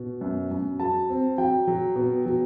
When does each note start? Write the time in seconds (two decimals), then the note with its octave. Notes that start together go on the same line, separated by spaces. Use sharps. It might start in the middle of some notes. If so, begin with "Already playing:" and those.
Already playing: B2
0.21 F#2
0.51 F#2
0.79 F#3 A5
1.09 C4
1.38 F#3 G5
1.67 F#3
1.96 B2
2.26 F#3